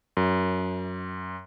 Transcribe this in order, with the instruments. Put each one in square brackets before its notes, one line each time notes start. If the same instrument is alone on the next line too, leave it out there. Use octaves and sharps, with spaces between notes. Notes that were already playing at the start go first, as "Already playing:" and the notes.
[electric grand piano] F#2